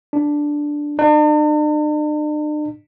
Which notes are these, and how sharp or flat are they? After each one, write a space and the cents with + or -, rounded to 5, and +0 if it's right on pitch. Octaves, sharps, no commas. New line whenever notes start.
D4 +0
D4 +45